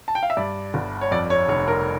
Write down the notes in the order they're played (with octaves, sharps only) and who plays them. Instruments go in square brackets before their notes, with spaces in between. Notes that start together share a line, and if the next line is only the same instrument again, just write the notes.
[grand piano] A5
G5
F5
E5
G2 D5
G1
C#5
F2 D5
C#5
F1 C#5
A#4